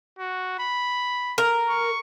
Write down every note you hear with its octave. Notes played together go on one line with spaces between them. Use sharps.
F#4
B5
A#4
C#6